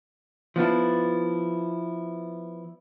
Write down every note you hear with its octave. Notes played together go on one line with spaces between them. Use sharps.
F3 B3 D4 E4